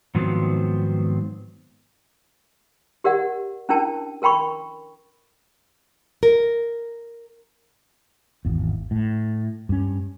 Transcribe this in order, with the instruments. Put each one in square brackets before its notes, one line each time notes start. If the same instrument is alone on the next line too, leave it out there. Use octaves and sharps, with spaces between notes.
[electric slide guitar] G#2 D#3 F3 F#3 B3 C4
[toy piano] G4 A#4 D5 F#5
C#4 D4 E4 A#4 G5 A5
A4 A#4 G5 B5 C#6
[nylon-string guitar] A#4
[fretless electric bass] G#1 E2
A2
G2 C#4